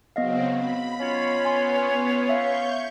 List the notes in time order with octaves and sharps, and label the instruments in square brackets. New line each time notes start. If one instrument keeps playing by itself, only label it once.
[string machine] C#3 F#3 C4 [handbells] B3 D#5 F5
[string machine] B5
[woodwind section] C#4 F4 C#5
[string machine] B3 [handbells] G#5 C6
[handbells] E5 F5 [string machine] C#6 G6